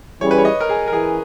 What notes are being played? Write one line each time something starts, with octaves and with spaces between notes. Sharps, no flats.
E3 G3 C#4 G#4 C#5
B4
C#5
D#5
A#4
G#4
A#4
E3 G#4